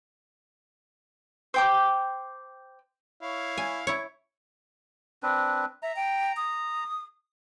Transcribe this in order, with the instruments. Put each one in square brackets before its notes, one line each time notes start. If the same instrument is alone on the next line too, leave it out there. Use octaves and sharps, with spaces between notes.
[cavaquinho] C5 G5 D6
[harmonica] E4 C#5 F5
[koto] G#5
[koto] E4 C#5 [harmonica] C#6
[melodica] C4 D4 B4
[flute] E5 [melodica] A#5
[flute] G5
D#6